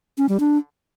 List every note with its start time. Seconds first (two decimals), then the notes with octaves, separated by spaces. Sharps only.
0.18 C#4
0.29 G3
0.40 D4